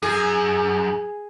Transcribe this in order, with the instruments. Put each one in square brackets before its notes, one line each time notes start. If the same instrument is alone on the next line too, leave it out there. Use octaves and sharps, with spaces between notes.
[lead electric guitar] F#2 [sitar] G#4